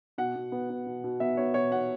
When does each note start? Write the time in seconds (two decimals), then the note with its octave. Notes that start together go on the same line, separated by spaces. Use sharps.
0.18 B2 F#5
0.35 B2
0.52 B3
0.70 B3
0.86 B2
1.04 B2
1.20 B3 E5
1.37 B3 C#5
1.54 B2 C#5
1.71 B2 F#5